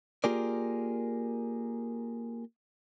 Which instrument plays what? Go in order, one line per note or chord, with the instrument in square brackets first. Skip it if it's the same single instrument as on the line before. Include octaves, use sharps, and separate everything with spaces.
[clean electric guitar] A#3 F4 G4 G#4 A#4 D5